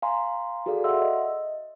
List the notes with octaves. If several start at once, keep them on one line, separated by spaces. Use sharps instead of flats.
F5 G#5 A#5 C6
F#4 G#4 A4 D5 F5
E5 F#5 C6 E6
D#5